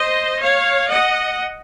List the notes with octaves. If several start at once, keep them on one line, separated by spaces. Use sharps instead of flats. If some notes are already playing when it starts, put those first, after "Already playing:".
Already playing: C5 D#5
C#5 F5
D#5 F#5